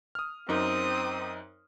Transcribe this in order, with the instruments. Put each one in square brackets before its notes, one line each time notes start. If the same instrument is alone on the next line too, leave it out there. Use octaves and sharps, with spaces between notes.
[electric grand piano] D#6 F6
[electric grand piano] F#2 D#4 A#4 [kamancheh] C4 D#6